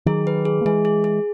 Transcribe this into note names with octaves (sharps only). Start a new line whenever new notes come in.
D#3 F#3 G#4
B4
G#4
A#3
E3 G#3 G#4
G#4
G#4